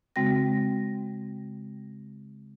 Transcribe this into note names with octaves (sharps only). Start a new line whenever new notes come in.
C#3 G#3 C4 F#4 G5 A#6